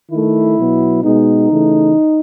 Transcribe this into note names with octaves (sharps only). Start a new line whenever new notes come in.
D#3 A3 E4
B2 F#3 B3
B2 G#3 B3 D#4
C#3 E3 A3